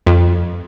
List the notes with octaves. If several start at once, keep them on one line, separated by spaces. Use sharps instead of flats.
F2